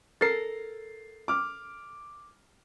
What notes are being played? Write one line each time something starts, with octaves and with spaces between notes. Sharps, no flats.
A4 A#4 A6 C7
D6 F6